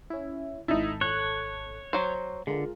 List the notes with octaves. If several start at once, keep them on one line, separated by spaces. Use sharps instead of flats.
C#4 E4
G#1 D#4 E4 A4 A5
C#5 F#6
F#3 C5 F#5
D3 G#3 F4 A#4